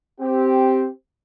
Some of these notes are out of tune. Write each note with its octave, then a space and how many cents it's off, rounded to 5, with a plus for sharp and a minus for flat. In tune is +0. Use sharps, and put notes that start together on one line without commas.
C4 +0 G4 -5